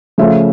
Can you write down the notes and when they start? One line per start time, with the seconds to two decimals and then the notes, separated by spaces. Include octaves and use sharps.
0.18 C#3 F3 A3 C#4 F4 E5